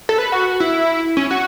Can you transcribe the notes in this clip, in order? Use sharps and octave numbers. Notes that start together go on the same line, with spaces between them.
A4
B4
F#4
E4
C#4
F#4